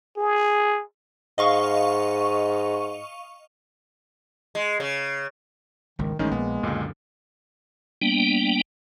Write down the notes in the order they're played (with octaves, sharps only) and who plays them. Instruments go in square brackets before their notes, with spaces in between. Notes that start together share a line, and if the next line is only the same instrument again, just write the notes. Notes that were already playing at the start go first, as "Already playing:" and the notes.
[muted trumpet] G#4
[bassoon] G#2 [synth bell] D#5 F5 C#6
[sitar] G#3
C#3
[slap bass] G#1 C#2 [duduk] D#3
[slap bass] A1 [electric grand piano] D#3 C#4 D#4 [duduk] G#3
[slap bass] A#1 [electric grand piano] A#3 B3
[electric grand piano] C#2 A#2 [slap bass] F#2 D3
[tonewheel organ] G3 A#3 B3 D4 G5